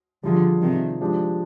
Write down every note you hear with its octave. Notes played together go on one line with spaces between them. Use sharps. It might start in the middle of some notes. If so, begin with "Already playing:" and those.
D3 F3 G3 D4 F4 G#4
C3 D#3
F3 G#3 D4 G4